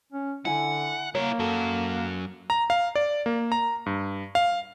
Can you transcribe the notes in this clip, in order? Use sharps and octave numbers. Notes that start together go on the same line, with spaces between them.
C#4
D3 E4 F#5 G#5
A#3 E4 A#4 C#5
F#2 F#4 A4
A#5
F5
D5
A#3
A#5
G2
F5